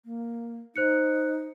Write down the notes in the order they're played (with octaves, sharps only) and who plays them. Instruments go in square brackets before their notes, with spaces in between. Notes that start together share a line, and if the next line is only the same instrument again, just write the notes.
[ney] A#3
[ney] D#4 [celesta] C5 F#6 C#7